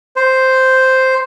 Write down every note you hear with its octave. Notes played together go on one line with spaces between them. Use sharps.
C5